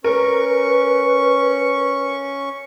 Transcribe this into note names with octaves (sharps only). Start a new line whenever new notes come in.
C#4 A#4 B4 C#6